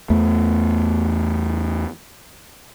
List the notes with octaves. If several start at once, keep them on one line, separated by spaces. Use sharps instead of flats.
E2 A3